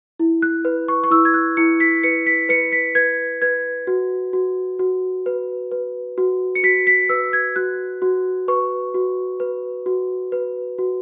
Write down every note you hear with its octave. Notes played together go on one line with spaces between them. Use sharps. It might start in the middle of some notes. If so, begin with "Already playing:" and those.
E4
F#6
B4
C#6
C#6
E4 E6
G#6
F#6
E4 C#7
B6
B4 C#7
B6
B4 C#7
B6
B4 G#6
B4 G#6
F#4
F#4
F#4
B4
B4
F#4
C#7
F#4 B6
B6
B4 E6
G#6
F#4 F#6
F#4
B4 C#6
F#4
B4
F#4
B4
F#4